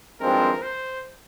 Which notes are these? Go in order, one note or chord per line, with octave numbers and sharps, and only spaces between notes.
G#1 G2 F3 G#3 C4 A#4
C5